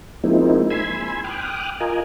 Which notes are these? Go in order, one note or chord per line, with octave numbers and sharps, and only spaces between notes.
F3 G#3 A#3 C4 D#4 E4
G#5 B5 C6 E6 G#6
G5 D6 D#6 F6 F#6
F4 A#4 D#5 G#5